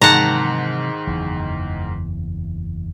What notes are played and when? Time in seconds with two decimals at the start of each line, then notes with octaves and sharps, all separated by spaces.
0.01 G#2 C3 D#3 E3 F#3 F#5 A5 A#5
1.07 F#1 E2 E3